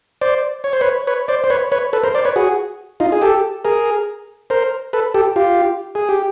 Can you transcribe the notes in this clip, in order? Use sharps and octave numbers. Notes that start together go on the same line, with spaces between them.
C5 D5
C#5
C5
B4 C#5
B4 C#5
C5 D5
C5
B4 C#5
B4 C#5
A4 B4
A#4 C5
C5 D5
B4 C#5
F#4 G#4
D#4 F4
G#4
G4 A4
G#4 A#4
A#4 C5
A4 B4
G4 A4
F4 G4
G#4
G4